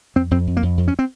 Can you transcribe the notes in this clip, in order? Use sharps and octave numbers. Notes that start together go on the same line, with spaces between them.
F2 C4
F2 C4
F2
A#3
F2
F2
C#4
C4